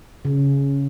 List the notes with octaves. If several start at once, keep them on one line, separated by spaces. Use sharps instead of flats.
C#3